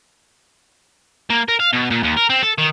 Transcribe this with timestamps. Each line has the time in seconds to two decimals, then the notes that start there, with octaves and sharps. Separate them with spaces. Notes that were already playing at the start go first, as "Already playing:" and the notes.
1.30 A#3
1.48 A#4
1.60 F5
1.73 B2
1.91 A#2
2.03 D#2
2.17 A#4
2.30 C4
2.42 A4
2.58 D#3